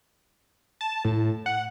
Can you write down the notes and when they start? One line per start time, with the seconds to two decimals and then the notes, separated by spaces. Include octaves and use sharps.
0.81 A5
1.05 A2
1.46 F#5